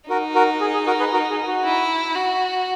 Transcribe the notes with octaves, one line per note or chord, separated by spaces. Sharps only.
D#4 F#4 A#4
F#4 A#4
G#4
G#4
F#4 A#4
G#4 B4
F#4 A#4
G#4
F#4
E4
F#4